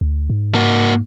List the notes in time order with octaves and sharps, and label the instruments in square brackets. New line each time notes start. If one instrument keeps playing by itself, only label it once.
[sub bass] D2
G#2
[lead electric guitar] A#3 F#4